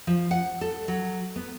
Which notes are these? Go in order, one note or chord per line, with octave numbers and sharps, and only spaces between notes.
F3
F#5
A4
F#3
B3